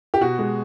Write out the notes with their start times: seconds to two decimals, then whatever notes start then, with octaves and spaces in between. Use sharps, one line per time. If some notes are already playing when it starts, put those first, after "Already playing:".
0.14 G4
0.21 B2 F#4
0.39 G#3